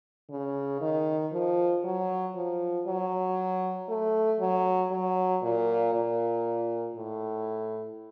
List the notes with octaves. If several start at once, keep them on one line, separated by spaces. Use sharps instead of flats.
C#3
D#3
F3
F#3
F3
F#3
A3
F#3
F#3
A#2
A#2
A2